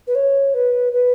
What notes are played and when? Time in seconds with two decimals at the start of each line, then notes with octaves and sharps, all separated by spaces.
0.07 B4
0.15 C#5
0.54 B4
0.92 B4